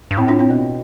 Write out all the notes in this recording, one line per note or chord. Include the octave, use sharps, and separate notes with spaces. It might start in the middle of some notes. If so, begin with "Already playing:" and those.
G2
A2 C4 E4
D4 F4
C4 E4
B2 B3